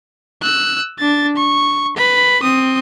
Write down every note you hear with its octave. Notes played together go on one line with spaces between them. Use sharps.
E6 F#6
D4 A6
C#6
B4 B5
C4 D#6